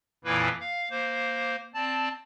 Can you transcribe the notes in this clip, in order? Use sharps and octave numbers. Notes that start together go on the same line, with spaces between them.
F2 A#2 E3 A#3 E4 B4
F5
A#3 C5
C4 D5 A5